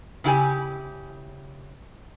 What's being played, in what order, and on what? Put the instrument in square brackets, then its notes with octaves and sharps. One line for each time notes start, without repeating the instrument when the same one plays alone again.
[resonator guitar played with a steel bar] C#3 E4 G4 G#5